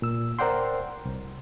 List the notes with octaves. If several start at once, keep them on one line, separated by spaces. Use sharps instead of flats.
A#2 E6
A#4 C5 D5 F#5 G5 C6
C2